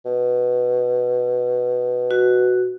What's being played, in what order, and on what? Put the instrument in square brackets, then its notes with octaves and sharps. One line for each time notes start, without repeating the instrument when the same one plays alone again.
[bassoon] B2
[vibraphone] F#4